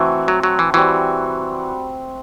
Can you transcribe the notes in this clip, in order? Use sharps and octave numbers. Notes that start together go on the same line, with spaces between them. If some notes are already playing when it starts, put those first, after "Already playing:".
Already playing: E3 A3 C4 F#4
F#3
F#3
E3
E3 G3 C4 F#4